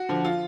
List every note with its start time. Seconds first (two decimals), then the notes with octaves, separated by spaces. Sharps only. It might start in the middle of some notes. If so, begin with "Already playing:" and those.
Already playing: F#4
0.09 D3 F3
0.24 F4